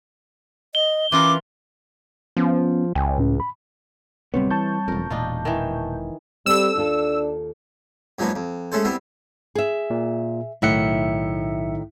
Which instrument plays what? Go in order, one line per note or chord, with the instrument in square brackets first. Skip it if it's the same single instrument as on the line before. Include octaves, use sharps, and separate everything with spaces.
[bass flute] D#5 [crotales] G7
[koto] E3 F4 A#4 [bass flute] C#4 [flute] D6
[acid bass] F3 [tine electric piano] B3 C#4
[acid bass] C#2 [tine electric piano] G5 G#5
[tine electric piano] A2 C#4
B5
[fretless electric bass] D1 C3 B3 [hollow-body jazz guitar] G3 C4 C#5
[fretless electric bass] E3 [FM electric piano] A5 C#6 G6
[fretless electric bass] E1 F2 [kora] A#4
[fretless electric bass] E1 [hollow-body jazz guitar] A#2 [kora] D4 D#4 F4
[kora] D#3 E3
[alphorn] G3 [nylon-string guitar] C4 A4 [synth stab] E6
[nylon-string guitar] D#2 F4 A4 [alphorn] D4
[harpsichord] F#2 F3 G#3 A#3 B3 D#4
F2
G#3 A3 C#4 A4 C5
G3 B3 C4 E4
[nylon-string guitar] G#4 E5
[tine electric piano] A#2
[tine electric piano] B1 E5 C#7 [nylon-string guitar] A2 D#3 F#5